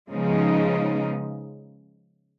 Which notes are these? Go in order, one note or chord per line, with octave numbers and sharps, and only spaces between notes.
C#3 F3 G#3 B3 D#4